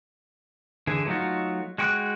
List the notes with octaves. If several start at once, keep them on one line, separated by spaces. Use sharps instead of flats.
D3 E3 G#4
F#3 A3 D#4 F4 F#4
G#3 F#4 G5 C#6 F#6